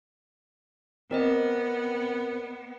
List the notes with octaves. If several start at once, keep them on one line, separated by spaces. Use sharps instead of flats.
B3 C4 A#4 D5 D#5